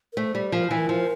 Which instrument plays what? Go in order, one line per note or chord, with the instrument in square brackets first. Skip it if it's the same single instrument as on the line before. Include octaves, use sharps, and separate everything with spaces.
[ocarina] A#4
[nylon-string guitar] A3 [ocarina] C5
[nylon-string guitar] G3
[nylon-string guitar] F3 [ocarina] A#4
[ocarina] C5
[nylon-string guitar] E3
[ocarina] A#4
[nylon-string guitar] F3